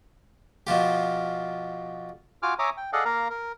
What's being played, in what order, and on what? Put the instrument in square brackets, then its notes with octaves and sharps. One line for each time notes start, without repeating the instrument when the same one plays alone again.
[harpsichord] B2 F3 F4 G4
[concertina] F4 F#4 G#5 D6 F6
C#5 E5 G#5 A#5 D6 D#6
G5
G#4 A4 D5 D#5 F5 F#5
A#3 A#4 F5 A#5
A#4